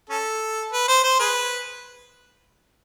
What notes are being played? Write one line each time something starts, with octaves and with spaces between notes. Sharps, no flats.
C#4 A4
B4
C5
C5
G#4 B4